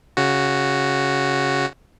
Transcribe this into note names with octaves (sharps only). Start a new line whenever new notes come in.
C#3 F#4